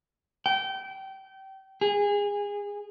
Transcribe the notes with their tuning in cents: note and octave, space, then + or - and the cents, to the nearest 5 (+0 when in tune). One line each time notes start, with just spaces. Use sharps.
G5 -25
G#4 -25